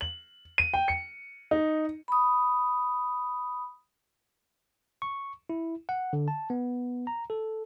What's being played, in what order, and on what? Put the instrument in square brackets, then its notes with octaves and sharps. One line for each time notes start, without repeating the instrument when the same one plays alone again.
[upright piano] F#7
D#7
G5
C#7
D#4
[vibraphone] B5 D#6
[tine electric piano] C#6
E4
F#5
D3
A5
B3
A#5
A4